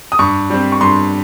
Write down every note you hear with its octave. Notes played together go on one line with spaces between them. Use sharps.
D#6
G2 C#6
G3 C4
C#6
G2 C6